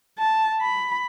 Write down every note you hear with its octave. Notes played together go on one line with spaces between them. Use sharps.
A5
B5